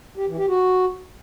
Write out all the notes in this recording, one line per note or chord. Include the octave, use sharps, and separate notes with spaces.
G4
E3
G4
F#4